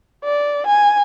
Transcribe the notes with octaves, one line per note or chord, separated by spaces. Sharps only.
D5
G#5